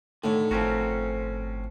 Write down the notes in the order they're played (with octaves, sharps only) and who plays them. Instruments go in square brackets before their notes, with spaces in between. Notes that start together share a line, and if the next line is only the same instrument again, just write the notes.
[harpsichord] A2 [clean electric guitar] D3 [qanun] D#3 C#5
[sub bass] G1 [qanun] F3 A#4 [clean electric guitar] C4 C#4 F#4